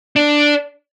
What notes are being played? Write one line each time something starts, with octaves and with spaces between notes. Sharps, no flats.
D4